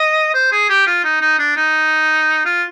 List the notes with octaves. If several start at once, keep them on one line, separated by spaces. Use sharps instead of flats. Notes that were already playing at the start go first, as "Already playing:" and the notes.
Already playing: D#5
C5
G#4
G4
F4
D#4
D#4
D4
D#4
F4